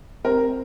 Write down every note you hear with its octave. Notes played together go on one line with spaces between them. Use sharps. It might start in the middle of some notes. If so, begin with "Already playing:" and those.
C4 A#4